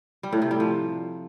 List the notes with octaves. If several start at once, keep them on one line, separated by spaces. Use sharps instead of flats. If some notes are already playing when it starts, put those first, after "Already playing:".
G3
A2
C3
G3
F3